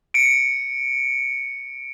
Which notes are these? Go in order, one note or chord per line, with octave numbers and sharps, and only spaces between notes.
C#7 D7